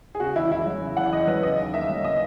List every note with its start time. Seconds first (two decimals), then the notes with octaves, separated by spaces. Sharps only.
0.15 G#4
0.20 C#3 F#4
0.36 E2 E4
0.51 E2 E4
0.66 F#3
0.81 C#3
0.97 E2 F#5
1.13 E2 D#5
1.27 F#3 B4
1.43 C#3 D#5
1.59 D#2
1.74 A#3 E5
1.89 F#3
2.04 C#3 D#5